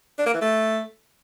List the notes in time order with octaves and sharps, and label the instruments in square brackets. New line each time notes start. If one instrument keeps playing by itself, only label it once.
[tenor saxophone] D4
A#3
E3
A3